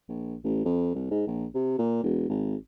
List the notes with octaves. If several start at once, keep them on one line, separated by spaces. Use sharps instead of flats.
A#1
A1
F2
C2
G#2
A#1
C3
A#2
E1
G#1